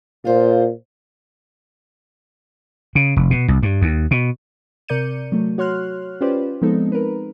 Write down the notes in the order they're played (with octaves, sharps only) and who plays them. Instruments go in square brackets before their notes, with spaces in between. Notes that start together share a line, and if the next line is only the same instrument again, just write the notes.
[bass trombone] A#2 [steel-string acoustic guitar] F4 C5
[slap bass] C#3
F1
B2
C2
G2
D#2
B2
[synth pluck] C3 A#4 D5 G6 C#7 D#7
F#3 A3
F#4 C#5 C6 F6 F#6
C#4 F4 G4 B4 C5 D5
F3 G#3 B3 C4 D#4 A4
A#4 B4